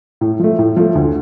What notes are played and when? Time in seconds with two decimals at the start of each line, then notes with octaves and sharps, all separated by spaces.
0.21 A2
0.39 F3 A3
0.59 A2
0.76 F3 A3
0.95 D2